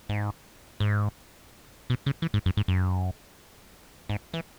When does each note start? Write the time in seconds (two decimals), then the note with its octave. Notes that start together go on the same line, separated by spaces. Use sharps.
0.09 G#2
0.80 G#2
1.90 B2
2.06 C#3
2.22 E3
2.34 G#2
2.46 F#2
2.57 G#2
2.68 F#2
4.09 G#2
4.34 E3